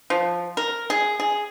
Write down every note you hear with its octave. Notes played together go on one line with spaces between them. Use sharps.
F3
A#4
G#4
G#4